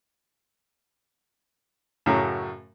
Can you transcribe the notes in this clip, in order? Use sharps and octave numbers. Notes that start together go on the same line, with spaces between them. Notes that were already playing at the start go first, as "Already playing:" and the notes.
F#2 A2 C#3 F#3